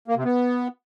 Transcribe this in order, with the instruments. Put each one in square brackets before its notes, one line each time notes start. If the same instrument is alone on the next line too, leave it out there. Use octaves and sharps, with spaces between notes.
[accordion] A#3
C3
B3